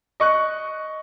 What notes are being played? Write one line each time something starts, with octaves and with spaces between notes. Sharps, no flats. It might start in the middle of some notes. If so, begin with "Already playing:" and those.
D#5 C#6 F#6